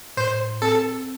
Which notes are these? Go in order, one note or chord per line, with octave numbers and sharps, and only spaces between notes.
A2 C5
C4 A4